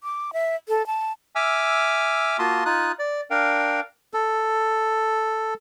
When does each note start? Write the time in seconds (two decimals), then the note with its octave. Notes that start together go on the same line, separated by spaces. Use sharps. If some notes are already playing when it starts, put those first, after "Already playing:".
0.03 D6
0.33 E5
0.68 A4
0.87 A5
1.35 E5 G#5 D6 E6 F6
2.39 A#3 F4 F#4 A5 C6 D#6
2.65 D#4 F4 D#6 F#6
2.99 D5
3.31 D4 A#4 F5 G5
4.14 A4